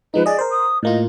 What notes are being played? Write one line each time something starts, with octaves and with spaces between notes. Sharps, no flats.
F3 G#3 D#4 B4
G#4 D5 D#5
A#4 C5
D#6
A2 A#3 F4 D#5